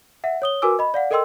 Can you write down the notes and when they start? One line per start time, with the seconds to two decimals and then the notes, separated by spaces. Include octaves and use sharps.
0.24 E5 F#5
0.42 C#5 D#6 G7
0.62 F#4 A#4 B4 G#5 D6 E6
0.79 D#5 B5
0.94 D5 F5 F#5
1.11 A4 A#4 D#5 G5 C6 E6